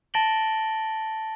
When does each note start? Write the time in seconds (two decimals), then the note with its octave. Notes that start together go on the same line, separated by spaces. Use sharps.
0.14 A5 A6 A#6 D7 F#7 G7